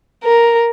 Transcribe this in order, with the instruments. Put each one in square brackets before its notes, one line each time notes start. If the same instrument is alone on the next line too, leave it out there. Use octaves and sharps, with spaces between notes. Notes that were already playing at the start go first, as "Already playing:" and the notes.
[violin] A#4